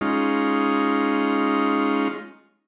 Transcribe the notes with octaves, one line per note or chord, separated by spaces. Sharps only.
G#3 C#4 D#4 F4